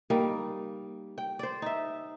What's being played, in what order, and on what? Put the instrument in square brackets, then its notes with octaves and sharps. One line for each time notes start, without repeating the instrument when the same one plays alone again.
[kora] G3 A#3 D#4
G5
C5 D5
D#4 E5